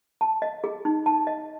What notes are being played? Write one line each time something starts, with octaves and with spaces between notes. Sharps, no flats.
A5
D#5
G#4
D#4
A5
D#5